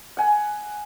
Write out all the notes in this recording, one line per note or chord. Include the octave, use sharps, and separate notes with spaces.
F#5 G#5